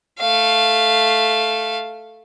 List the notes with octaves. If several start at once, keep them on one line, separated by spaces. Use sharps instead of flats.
A3 F5